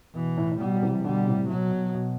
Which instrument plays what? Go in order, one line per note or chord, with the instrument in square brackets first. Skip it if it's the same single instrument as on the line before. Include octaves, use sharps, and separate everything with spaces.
[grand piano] B2 [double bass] E3
[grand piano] A2
A2
[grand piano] B2 [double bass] G3
[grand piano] F#3
C3 E3
[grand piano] B2 D3 [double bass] G3
[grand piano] A2 C3
[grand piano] B2 [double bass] F#3
[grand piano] B2
B2